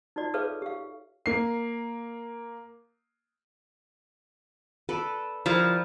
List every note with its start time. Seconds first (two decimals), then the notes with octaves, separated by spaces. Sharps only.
0.16 D#4 F4 F#4 D5
0.34 G#4 A4 B4 C#5 E5 F5
0.62 G4 F5
1.26 A#3 C7
4.89 A4 B4 D5
5.46 F3 G3 E4 A#4